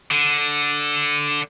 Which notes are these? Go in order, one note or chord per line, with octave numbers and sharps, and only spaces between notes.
D3